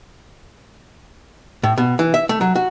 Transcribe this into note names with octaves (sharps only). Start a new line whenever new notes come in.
A2
B2
E3
E5
A3
F#3
F#4